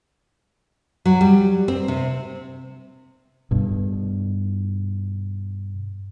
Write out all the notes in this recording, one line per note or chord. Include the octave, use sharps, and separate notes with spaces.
F#3
G3
C4
C3
G2 B2